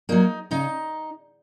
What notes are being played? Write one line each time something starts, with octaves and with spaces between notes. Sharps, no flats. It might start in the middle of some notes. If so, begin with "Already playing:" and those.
F#3 A#3 D#4
C#3 D#4